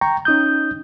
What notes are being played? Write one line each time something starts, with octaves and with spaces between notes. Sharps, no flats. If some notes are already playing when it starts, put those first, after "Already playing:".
G5 A#5 C#6
C#4 D#4 D#6 G6